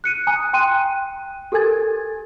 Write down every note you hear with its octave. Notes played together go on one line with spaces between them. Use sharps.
F#6 C#7 D#7
G#5 A#5 D#6 F#6
G5 C6 F#6 D#7
G4 A4 A#4 G#5 G#6 A6